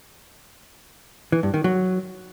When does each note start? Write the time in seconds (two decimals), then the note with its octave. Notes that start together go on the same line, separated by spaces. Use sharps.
1.32 E3
1.43 G2
1.54 D#3
1.64 F#3